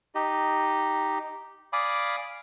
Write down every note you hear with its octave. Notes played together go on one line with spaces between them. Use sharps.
D#4 G4 D#5
D5 F5 G#5 B5 D6 D#6